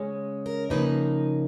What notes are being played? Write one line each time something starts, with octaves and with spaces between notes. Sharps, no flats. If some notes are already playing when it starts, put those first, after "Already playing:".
Already playing: C#3 G#3 C#4
A#4
C#3 F3 A#3 D#4 B4